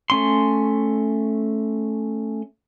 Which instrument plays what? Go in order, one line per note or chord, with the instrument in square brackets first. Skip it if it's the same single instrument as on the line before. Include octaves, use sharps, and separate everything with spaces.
[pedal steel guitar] A3 C#4 C6